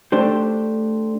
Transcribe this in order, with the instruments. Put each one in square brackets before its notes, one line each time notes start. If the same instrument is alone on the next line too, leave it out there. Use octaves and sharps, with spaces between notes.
[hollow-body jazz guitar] A3 D4 G4 C5